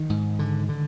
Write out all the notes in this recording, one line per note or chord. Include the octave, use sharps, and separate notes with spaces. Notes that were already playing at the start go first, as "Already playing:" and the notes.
Already playing: D#3
G#2
D3
D3